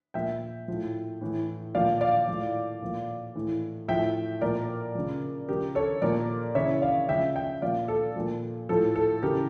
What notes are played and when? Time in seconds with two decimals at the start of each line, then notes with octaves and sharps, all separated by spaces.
0.14 A#2 F3 E5 G5
0.68 A2 F3
1.21 A2 E3
1.75 A#2 F3 D5 F5
2.01 D5 F5
2.28 A2 F3
2.82 A#2 F3
3.35 A2 E3
3.88 A2 F3 E5 G5
4.41 A#2 F3 A#4 D5
4.95 C#3 F3
5.48 C#3 F3 G4 A#4
5.75 A4 C#5
6.02 A#2 F3 A#4 D5
6.55 C#3 E3 C#5 E5
6.82 D5 F5
7.09 C#3 F3 E5 G5
7.36 E5 G5
7.62 A#2 F3 D5 F5
7.88 A4
8.16 A#2 F3
8.69 A2 F3 A4
8.96 A4
9.22 C#3 E3 G4 A#4